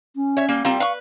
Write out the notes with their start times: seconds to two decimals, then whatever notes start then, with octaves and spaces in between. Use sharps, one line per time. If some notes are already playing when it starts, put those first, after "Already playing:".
0.15 C#4
0.37 C#5 E5
0.49 G3 A#3
0.65 G3 A#3 C4 F4 G5
0.80 B4 F5 C#6